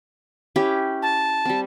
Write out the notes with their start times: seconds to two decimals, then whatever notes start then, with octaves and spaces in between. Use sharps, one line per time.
0.56 C#4 E4 G4
1.02 A5
1.45 G3 C4